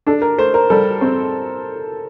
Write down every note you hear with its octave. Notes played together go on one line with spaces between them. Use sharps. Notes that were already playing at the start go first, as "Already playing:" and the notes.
D4 A4
A#4
A3 C5
A#4
G3 A4
C4